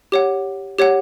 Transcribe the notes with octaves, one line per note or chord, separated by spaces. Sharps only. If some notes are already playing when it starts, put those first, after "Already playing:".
G4 C#5 F#5
G4 C#5 F#5